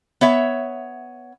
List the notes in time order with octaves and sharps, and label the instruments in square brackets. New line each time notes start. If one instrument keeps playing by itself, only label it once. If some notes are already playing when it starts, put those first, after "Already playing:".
[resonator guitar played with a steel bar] B3 C#5 E5